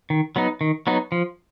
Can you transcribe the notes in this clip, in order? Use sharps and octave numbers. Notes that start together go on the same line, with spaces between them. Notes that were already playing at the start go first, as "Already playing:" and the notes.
D#3
F#3 B3 D#4
D#3
F#3 B3 D#4
F3